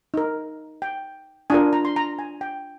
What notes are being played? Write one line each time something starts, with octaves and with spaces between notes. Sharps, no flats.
D#4 A#4
G5
D4 F4 A#4 G#5
A#5
C6
A#5
G#5
G5